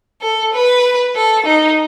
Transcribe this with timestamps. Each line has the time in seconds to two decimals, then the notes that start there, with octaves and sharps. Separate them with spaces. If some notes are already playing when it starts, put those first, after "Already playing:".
0.22 A4
0.53 B4
1.15 A4
1.46 D#4